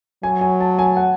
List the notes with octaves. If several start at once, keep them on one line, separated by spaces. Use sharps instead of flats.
F#3 G#5
G#5
A5
G#5
F#5